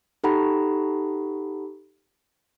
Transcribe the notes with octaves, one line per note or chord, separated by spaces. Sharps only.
D#4 G4 A4 F#5 A#5 B5